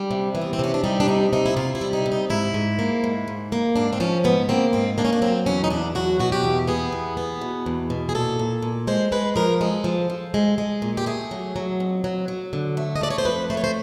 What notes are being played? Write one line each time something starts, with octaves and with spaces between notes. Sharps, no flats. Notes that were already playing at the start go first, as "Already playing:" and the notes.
Already playing: G3 D4
C3
E3
B3
C4
C3 C#4
D4
G3 D#4
D4
C3 D#4
C3 D#4
E4
C3 F4
E4
G3
D#4
C3
D#4
G#2 E4
G#2
A#3
G#2
G#2
A#3
G#2 D4
C4
F3 C#4
G#2 B3
A#3 C4
G#2 C4
A#3 D4
C#4
D4
F#3 C4
E2 C#4
D#4
E2 D4
F#3 F#4
B2 F#4
G4
E2
B3 G#4
E2
B3
B2
E2
B2
G#4
A#2 A4
A#2
A#2
G#3 C5
G#3 B4
F3 A#4
G#3 A4
F3
F3
G#3
G#3
A#2
G4
A3 G#4
F#3
F#3
F2
F#3
F#3
D3
A3
D#5
A3 D5
C#5
C5
F2 B4
A3 C5
C#5
C5